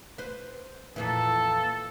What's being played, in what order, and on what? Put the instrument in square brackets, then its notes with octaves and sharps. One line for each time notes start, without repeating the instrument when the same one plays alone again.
[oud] B4 C5
[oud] F2 A#2 E3 [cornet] A4